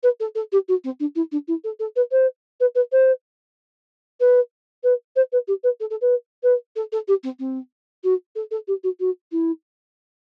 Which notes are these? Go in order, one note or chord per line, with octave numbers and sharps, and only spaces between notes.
B4
A4
A4
G4
F#4
C4
D4
E4
D4
E4
A4
A4
B4
C5
B4
B4
C5
B4
B4
C5
B4
G4
B4
A4
A4
B4
B4
A4
A4
G4
C4
C4
F#4
A4
A4
G4
F#4
F#4
E4